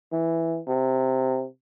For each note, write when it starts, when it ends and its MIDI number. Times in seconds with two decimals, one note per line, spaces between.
0.12 0.60 52
0.68 1.46 48